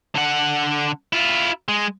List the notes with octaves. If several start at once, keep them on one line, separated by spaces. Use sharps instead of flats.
D3 F#5
E4 F4
G#3